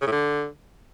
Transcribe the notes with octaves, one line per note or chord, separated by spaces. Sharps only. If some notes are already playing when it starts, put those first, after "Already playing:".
C#3
A2
D3